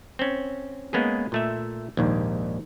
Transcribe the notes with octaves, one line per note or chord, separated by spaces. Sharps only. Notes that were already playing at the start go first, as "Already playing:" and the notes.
C4 C#4
G#3 A#3 B3 C#4 G#4
A#2 A3 E5
A#1 D#2 G#2